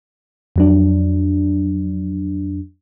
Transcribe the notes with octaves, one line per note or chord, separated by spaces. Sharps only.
F2 F#3 D4